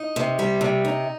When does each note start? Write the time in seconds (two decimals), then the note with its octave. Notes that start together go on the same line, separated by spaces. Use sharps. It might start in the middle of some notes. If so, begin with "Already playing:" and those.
Already playing: D#4
0.16 C3
0.39 G3
0.61 C3
0.85 D#4